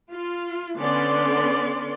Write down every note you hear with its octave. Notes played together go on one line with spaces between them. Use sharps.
F4
D3 B3 C#4 D5 C6